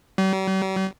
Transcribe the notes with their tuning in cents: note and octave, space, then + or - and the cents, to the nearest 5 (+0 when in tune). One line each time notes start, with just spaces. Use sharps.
G3 -45